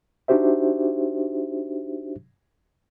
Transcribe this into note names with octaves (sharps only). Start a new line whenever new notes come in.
D4 D#4 F#4 G4 C5 E5